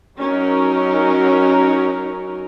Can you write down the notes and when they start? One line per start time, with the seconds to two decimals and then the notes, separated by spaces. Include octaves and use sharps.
0.19 F#3 C#4 D#4 A#4